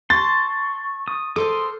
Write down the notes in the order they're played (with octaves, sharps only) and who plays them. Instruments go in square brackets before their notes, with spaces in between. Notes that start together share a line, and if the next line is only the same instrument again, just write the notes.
[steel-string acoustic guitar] A5 [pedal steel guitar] C6 [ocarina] C#6 [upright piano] A6
[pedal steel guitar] D#6
[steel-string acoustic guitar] A4 A#4 C5 [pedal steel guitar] C6 D6 D#6